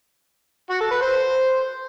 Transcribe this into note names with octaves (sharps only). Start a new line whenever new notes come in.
F#4
A4
B4
C5